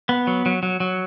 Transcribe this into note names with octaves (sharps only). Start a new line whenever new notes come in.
B3
F#3
F#3
F#3
F#3